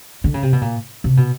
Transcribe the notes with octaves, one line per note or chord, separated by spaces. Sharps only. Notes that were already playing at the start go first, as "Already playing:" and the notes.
D3
C#3
C3
B2
A#2
C3
B2